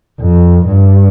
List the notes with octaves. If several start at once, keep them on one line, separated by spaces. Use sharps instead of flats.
F2
G2